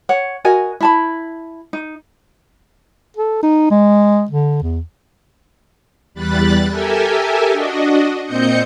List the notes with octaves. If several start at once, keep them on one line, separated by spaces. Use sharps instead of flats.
C#5 F#5
F#4 A#4 D#5 G#5
E4 A5 B5
D#4
A4
D#4
G#3
D3
E2
E2 G3 B5 F#6 A6
G4 A4 A#4 E5 G#5
D4 F#4 D#5
A#2 C4 D#5 G6 C#7